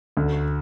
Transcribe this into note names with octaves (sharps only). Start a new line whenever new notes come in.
D2